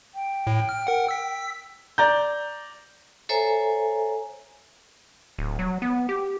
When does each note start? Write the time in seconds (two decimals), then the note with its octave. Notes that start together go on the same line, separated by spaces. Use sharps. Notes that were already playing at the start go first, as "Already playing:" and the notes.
0.15 G5
0.47 A2
0.69 F6
0.87 A#4 F#5
1.09 E6 B6
1.98 D5 A#5 G6
3.29 A4 C5 C#5 E5 G#5 A#5
5.39 D1
5.59 F#3
5.82 B3
6.09 G4